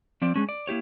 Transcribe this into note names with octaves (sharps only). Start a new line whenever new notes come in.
F3 C4 D5
G#3 C#4 D4
D5
A#3 E4 G4 C#5